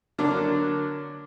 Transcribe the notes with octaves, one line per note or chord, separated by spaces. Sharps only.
D3 F#3 A#3 D4